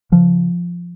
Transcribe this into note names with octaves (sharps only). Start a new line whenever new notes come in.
C#3 F3